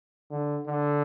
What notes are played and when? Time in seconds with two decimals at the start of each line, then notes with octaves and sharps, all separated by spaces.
0.31 D3
0.67 D3